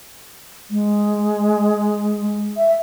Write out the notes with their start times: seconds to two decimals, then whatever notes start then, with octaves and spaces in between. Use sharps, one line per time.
0.71 G#3
2.57 E5